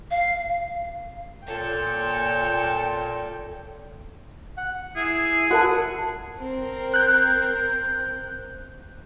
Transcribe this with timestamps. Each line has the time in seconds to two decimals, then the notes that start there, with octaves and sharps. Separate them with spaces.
0.11 F5
1.47 A#2 A4 C#5 G5
4.57 F#5
4.96 E4 G#4
5.51 F#4 A#4 F#5 A5
6.39 C4 A#4
6.94 F#6 G6